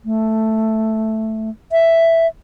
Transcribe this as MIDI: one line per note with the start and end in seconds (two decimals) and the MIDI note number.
0.05 1.50 57
1.72 2.27 76